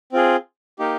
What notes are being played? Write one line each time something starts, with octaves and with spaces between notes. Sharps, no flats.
C4 F4 G#4
A#3 D#4 G4